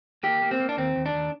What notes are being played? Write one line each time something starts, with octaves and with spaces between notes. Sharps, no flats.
A#3 G4
A#3
C4
A#3
D4
D#2 C4
D#2
D4
D#2